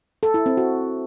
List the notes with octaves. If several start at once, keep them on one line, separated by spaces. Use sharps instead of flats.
A4
E4
C4
F#4